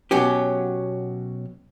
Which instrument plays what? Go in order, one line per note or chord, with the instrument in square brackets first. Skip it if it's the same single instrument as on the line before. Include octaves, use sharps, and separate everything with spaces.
[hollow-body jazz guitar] B2 F#3 C#4 G4